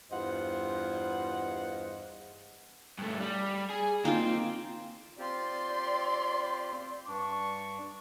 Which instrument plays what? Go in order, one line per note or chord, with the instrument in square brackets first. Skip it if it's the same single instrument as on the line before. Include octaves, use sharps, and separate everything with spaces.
[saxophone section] E2 G2 F4 C5 D#5 F#5
[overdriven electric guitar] G2 A3
G3
G#4
[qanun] A#3 D#4 F4 [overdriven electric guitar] C4
[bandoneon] C4 F4 G4 [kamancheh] D5 C6
[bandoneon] G2 D4 [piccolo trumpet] C#6